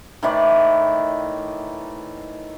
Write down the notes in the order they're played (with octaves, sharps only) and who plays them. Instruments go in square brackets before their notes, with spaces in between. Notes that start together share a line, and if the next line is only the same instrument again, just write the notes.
[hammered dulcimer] A2 D#3 E3 D5